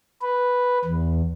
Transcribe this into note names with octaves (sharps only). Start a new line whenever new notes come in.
B4
E2